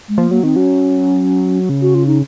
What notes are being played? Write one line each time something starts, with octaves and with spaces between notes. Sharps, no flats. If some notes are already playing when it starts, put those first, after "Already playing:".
G#3
F3 A#3
F#3 A#3
D#3 C4
F#3 C#4
C#3
F#4
F4
D#4